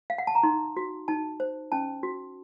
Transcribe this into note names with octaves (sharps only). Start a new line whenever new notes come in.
F5
F#5
A5
A#5
D#4 C6
F#4
D#4 A5
C5
C#4 A5
F#4